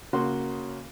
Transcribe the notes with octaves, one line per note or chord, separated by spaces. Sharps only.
C#3 A#3 F#4 C6